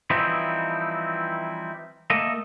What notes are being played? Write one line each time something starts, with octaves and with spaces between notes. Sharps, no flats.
E3 F3 G3 C4 D#4 E4
A3 A#3 A4 D#5